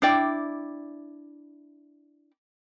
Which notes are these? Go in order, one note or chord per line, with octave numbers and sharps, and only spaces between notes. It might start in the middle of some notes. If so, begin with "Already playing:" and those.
D4 E4 D5 G5